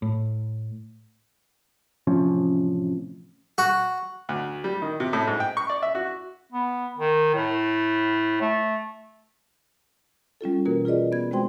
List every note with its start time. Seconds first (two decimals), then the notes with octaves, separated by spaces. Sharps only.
0.02 A2
2.07 A1 C3 F3 C#4
3.58 F#4
4.29 D2
4.64 G3
4.82 D#3
5.00 C3
5.13 A2
5.27 G#2
5.40 G5
5.57 C#6
5.69 D5
5.83 E5
5.95 F#4
6.52 B3
6.97 D#3
7.35 A2
8.41 A3
10.41 G3 C#4 F4 A4
10.66 B2 E3 A#3 F#4 A#4
10.85 F4 G#4 B4 D5 D#5
11.12 B3 G#6
11.31 G#3 C4 F#4 C5 G5 C6